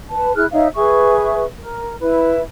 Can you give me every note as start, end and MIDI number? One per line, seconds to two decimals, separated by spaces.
0.12 0.34 71
0.12 0.34 81
0.35 0.46 64
0.35 0.46 68
0.35 0.46 89
0.35 0.46 90
0.52 0.68 63
0.52 0.68 73
0.52 0.68 76
0.52 0.68 77
0.75 1.44 68
0.75 1.44 71
0.75 1.44 76
0.75 1.44 85
1.59 1.97 70
2.00 2.40 64
2.00 2.40 71